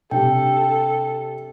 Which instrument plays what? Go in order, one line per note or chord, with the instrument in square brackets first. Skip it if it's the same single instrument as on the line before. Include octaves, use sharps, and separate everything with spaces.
[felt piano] C3 D4 G4 [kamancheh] A4 [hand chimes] G5